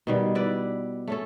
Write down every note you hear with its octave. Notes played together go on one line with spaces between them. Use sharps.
B2 D#3 G3
E4 B4 D5
A3 C#4 A4